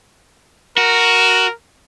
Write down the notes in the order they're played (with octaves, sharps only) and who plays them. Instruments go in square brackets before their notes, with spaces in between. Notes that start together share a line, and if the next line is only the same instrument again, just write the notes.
[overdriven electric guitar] F#4 [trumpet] A#4